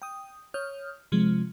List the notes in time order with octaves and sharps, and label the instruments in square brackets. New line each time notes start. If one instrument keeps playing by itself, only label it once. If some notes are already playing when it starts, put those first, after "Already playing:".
[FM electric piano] G5 D#6
C#5 D#6 F6 G6
C3 F3 G#3